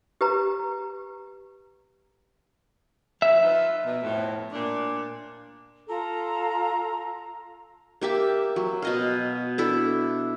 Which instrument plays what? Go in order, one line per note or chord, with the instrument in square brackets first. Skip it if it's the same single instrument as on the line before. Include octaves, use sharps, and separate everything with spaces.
[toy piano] G4 B4 A#5
[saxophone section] F3 [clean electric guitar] E5
[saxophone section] D#4 F4 B4
B2
F2 A2
A#2 D4
[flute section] F4 A4 A#5
[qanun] A#3 G4 E5 A5
F#3
B2 D#5 F5
D4 E4 A4